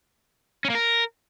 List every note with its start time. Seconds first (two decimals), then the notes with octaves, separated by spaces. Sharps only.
0.65 C#4
0.70 A#3
0.75 A#4